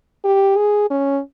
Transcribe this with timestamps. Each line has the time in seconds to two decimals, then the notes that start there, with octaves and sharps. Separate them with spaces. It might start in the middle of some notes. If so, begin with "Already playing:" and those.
0.24 G4
0.57 G#4
0.90 C#4